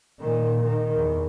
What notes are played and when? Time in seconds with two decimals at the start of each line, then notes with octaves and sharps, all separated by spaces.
0.20 A#2 D#3
0.62 D#3
0.95 E2